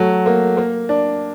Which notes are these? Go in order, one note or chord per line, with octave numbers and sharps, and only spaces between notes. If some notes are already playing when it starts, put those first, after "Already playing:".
Already playing: F#3 A3
A#3
A#3
D4